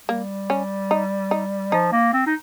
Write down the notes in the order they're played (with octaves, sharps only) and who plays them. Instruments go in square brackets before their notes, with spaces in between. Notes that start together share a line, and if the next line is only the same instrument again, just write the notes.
[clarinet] G3 [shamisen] A#3
[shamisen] C#4
D#4
D#4
[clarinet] F3 [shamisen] D#4
[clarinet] A#3
C4
D#4